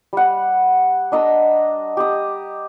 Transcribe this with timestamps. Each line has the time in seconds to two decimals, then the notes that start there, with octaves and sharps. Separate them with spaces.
0.13 G3 F#5
1.12 D4 D#5 A#5 E6
1.97 G4 D#6